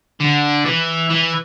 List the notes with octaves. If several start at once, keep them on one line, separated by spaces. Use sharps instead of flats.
D3
E3
E3